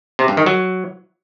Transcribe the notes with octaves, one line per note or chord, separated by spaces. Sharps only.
C3
G2
D#3
F#3